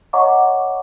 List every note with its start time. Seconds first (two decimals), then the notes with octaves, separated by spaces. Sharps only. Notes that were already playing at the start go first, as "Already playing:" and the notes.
0.13 C#5 D#5 F#5 A#5 C#6 D6